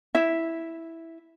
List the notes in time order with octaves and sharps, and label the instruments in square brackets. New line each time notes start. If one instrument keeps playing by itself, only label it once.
[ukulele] E4 E5